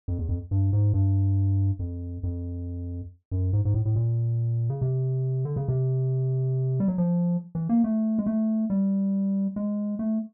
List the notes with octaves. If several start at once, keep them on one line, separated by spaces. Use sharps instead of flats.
F2
E2
F2
G2
G#2
G2
F2
F2
F#2
G#2
G#2
A2
A2
A#2
C#3
C3
D3
C#3
C3
G3
F#3
F3
E3
A#3
A3
G#3
A3
G3
G#3
A3